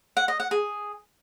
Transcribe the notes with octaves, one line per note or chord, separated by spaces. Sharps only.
F#5
D#5
F#5
G#4